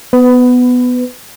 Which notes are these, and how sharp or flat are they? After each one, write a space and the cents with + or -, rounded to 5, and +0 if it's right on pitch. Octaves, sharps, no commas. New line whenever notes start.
B3 +5 B4 +25